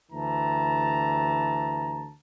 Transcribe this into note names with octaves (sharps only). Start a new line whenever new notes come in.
D2 E3 A5 A#5